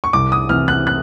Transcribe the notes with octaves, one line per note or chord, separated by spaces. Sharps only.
C#6
C2 D6
D#6
C3 E3 F6
F#6
F#6